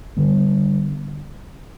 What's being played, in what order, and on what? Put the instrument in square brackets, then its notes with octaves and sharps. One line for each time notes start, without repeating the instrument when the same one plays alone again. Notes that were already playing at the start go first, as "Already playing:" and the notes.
[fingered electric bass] D3 G3 B3